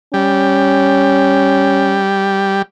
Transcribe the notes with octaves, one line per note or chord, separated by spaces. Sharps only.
G3 C#4